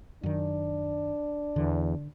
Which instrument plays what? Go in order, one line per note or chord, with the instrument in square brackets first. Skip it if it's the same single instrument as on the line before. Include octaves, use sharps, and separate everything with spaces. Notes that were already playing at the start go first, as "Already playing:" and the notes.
[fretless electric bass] F#2 D#3 [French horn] D4
[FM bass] E2 [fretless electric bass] D3